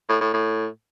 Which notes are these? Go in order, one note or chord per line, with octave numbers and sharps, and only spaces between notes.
A2
A2
A2